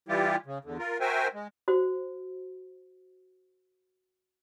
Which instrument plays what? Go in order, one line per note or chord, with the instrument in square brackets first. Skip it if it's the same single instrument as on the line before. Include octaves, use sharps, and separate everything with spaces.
[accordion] E3 G3 E4 F4 G4
C#3
E2 D3
F4 A#4
F#4 A#4 C5 E5 G5 G#5
G#3
[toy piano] F#4 C5